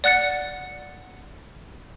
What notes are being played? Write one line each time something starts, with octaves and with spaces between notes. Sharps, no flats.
D5 F#5 F#6 A6 C#7